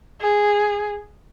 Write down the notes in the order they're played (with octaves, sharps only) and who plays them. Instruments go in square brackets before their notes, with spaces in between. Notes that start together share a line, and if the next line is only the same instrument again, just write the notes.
[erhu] G#4